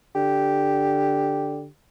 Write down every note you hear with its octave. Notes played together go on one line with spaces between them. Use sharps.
D3 G4